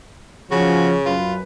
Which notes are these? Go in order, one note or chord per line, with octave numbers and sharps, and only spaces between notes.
C#3 F3 C#4 F#4
F#2 F4 B4